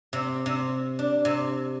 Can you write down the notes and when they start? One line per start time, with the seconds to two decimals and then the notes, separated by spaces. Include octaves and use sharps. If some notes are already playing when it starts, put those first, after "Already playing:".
0.13 C3
0.46 C3
0.99 D4
1.25 C3